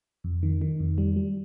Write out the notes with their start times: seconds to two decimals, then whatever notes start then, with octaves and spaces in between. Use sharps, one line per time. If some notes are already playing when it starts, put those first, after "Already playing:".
0.24 F2
0.43 D#3
0.61 D#3
0.80 F2
0.98 G3
1.16 G3